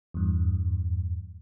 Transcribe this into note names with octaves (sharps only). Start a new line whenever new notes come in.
E2 G2